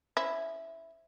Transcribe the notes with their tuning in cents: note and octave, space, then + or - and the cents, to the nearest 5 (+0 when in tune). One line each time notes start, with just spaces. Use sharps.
C#4 +10 E4 +0 C5 +0